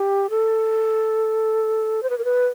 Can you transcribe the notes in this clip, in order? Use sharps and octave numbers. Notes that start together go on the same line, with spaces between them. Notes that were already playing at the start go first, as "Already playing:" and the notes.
Already playing: G4
A4
C5
B4
A#4
B4